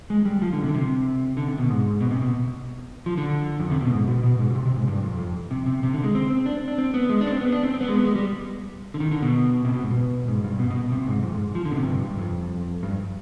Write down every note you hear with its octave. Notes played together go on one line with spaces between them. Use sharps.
G#3
G3
F3
D3
C3
D3
C3
D3
C3
B2
G#2
B2
C3
B2
F3
D3
F2
C3
B2
G#2
B2
B2
G#2
B2
C3
C3
G#2
G2
F2
F2
C3
C3
C3
D3
G#3
C4
C4
D4
C4
D4
C4
B3
G#3
D4
B3
C4
B3
D4
C4
C4
B3
G#3
B3
G#3
G3
D3
D#3
D3
B2
C3
B2
G#2
B2
G#2
G2
B2
B2
C3
G#2
F2
G#2
F3
D3
B2
C3
F2
G2
G2
F2
G2